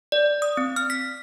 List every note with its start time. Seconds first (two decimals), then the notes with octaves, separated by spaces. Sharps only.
0.12 D5
0.42 D#6
0.57 C4
0.76 F6
0.90 B6